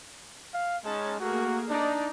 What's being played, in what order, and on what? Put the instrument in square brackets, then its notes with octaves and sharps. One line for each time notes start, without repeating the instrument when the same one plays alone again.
[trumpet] F5
[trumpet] G#3 [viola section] C#4 D#4 A5
[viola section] A3 A#3 G#4 [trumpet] F#4
[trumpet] D4 [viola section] D#4 D5